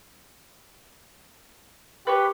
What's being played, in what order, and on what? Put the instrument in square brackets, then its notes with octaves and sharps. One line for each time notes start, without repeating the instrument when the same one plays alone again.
[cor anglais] G4 [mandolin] B4 C#5